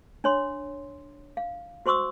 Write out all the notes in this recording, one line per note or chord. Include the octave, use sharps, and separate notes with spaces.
D4 C#5 C6
F5
F#4 C5 C6 C#6 D#6 E6